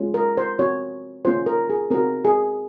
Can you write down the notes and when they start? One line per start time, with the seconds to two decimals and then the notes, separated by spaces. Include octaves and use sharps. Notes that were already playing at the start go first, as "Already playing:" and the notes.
Already playing: G#3 C#4 F4
0.14 A#4
0.37 C5
0.59 C4 F#4 C#5
1.25 A#3 C#4 F4 C5
1.46 A#4
1.70 G#4
1.90 C4 F#4 A#4
2.25 G#4